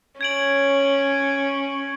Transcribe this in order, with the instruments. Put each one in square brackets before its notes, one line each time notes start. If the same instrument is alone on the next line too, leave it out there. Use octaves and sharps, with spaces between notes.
[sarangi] C#4 [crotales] G#6 D7 F#7